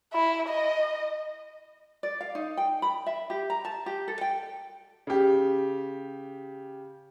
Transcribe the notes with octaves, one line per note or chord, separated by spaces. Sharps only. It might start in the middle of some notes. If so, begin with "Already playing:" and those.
E4
D#5
D5
F5
D#4
G5
B5
E5
G4
A#5
A5
G4
A4
G5
C#3 G4